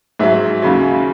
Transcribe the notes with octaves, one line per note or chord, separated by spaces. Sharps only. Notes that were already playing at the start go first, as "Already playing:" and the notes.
G#2 F#3 E5
D#2 C#3 F#3